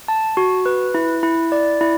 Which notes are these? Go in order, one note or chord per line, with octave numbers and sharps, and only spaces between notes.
A5
F#4
B4
E4
E4
D5
E4